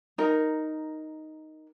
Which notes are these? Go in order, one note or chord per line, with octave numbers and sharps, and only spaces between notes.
D#4 A#4